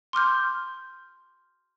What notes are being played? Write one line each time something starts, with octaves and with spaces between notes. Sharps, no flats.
C6 D6 F6 G6